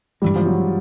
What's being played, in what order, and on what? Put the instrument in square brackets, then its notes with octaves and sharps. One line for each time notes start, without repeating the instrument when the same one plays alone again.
[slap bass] G2 E3 G#3 [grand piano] G3
[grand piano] F3
F#3